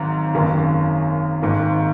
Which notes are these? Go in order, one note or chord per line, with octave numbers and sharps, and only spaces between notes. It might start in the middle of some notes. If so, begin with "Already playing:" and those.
Already playing: G#1 G#2 F#3
G#1 F#2 D#3 A#3 C#4
G#1 G#2 D#3 A#3